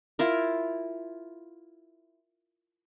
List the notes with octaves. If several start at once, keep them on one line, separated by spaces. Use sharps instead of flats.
E4 F4 A#4